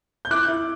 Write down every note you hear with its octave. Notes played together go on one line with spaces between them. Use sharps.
G6
E4 D6 F#6
E4